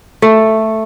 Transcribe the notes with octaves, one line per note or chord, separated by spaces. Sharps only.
A3